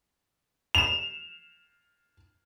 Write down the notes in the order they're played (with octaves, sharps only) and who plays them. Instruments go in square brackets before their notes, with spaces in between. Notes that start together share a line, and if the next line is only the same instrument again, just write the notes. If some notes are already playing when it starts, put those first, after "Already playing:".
[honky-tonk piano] E7 F7